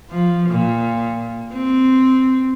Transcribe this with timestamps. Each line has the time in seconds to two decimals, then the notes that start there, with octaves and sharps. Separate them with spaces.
0.10 F3
0.49 A#2
1.54 C4